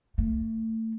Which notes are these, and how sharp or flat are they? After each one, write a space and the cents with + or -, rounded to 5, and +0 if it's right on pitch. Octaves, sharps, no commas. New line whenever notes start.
A3 +30